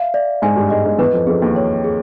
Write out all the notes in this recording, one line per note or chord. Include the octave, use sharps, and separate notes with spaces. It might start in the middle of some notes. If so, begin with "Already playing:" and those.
Already playing: E5 F5
D5
G#2 G#3 G#5
G2 G3
G#2 G#3 D#5
G#2 G#3
E2 E3 B4
F2 F3
F2 F3 G#4
D#2 D#3
C#5
G#4